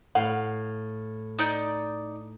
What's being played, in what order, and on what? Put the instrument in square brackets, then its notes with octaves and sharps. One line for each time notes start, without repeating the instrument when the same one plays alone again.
[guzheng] A2 F5 [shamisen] F#5
[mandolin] D#4 D5 G6